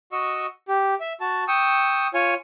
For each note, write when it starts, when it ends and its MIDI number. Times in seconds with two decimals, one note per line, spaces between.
0.12 0.46 66
0.12 0.46 75
0.12 0.46 85
0.12 0.46 88
0.68 0.94 67
1.00 1.13 76
1.21 1.44 66
1.21 1.44 81
1.48 2.07 79
1.48 2.07 85
1.48 2.07 87
1.48 2.07 88
2.14 2.34 65
2.14 2.34 73
2.14 2.34 80